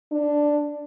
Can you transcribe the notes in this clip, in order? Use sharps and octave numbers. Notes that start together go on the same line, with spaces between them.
D4